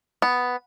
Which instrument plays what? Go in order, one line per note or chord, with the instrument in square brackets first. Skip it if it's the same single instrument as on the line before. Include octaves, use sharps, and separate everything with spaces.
[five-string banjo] B3